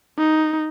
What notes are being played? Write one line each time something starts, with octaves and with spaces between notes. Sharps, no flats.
D#4